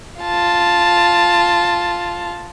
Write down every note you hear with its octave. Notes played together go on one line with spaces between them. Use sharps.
F4 A5